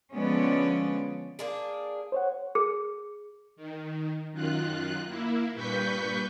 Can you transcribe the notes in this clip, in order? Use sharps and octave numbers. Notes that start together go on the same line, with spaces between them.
D3 F3 G#3 B3 C#4 D5
A#3 D4 G#4
C5 C#5 F#5
G#4
D#3
F#2 D#3 F4 F#6
A#3 E4
G2 A#2 B4 C#6 G6 B6